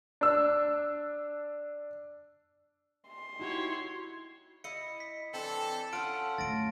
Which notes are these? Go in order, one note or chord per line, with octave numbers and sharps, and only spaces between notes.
D4 E6
C6
D#4 E4 F#4 G4 C#5
E4 D#5 C#7
B6
E3 C4 D4 A4
C#4 F4 A4 F#5 A5 F6 D7
D1 D2 A6 A#6 D7